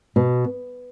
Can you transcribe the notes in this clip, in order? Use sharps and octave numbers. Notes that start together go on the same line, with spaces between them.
B2